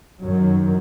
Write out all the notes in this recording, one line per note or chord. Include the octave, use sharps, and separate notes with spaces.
F#2 D#3 F#3